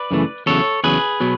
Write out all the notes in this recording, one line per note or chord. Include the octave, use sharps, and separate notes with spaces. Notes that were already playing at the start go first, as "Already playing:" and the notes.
Already playing: B4 D5
F#2 C#3 E3 A3
E2 C#3 F#3 A4 C#5
E2 C#3 F#3 G#4 B4
B2 F#3 B3